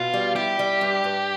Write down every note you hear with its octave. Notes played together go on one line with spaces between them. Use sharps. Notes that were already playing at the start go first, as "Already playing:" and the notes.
Already playing: B2 F4
G3
E4 G4
G3
G2
G2